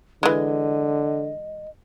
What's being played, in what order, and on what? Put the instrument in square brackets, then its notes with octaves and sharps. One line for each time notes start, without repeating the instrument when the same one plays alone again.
[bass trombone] D3 [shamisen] E3 G#3 [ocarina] D#5